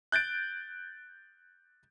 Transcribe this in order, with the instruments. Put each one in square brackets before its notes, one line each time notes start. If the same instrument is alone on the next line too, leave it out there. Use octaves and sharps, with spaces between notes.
[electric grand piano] F#6 G6 A6 D7